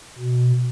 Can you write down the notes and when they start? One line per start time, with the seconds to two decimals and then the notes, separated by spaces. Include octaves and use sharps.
0.18 B2